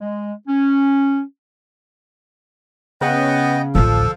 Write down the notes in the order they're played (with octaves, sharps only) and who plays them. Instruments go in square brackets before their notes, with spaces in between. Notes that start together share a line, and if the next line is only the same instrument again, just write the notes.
[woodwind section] G#3
C#4
[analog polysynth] C#3 [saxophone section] B3 [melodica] D#5 G5
[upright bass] A1 D2 [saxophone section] F3 [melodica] A4